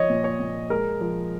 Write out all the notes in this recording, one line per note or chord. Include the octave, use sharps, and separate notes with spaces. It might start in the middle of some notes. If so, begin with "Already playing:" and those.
Already playing: F3 C#5 D#5
A#2
C#5
A#2
G#3 A#4
F3